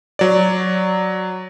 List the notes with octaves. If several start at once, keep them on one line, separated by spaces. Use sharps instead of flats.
F#3 D5